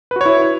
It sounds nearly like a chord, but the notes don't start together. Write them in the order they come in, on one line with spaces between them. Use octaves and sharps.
B4 F#4 C#5 E4